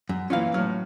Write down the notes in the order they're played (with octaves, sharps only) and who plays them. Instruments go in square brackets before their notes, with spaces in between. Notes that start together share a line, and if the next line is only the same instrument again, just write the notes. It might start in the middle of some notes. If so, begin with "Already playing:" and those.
[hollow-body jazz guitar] F#2
[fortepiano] A#2 E3 F4 [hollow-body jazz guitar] C#4 F5
[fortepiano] A2 F6 [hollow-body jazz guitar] F#3